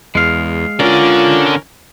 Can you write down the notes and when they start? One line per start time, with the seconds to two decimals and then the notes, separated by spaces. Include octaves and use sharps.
0.15 E2 G#3 F5
0.80 D3 C#4 F4 A#4 D5